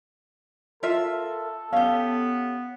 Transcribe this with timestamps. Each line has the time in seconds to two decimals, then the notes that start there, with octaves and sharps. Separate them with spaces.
0.83 F4 A4 A#4 E5
1.73 B3 C#4 G4 F5